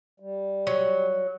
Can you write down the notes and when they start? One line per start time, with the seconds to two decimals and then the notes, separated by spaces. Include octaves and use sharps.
0.20 G3
0.67 F#3